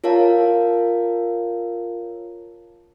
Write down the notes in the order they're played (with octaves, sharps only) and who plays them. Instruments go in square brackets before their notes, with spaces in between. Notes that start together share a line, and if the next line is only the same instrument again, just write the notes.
[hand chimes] F4 A#4 C#5 F5 A5